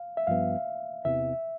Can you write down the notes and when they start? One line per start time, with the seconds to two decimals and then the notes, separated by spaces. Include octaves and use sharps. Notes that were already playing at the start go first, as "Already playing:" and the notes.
Already playing: F5
0.17 E5
0.27 G2 F3 B3 F5
1.05 E2 C3 E3 E5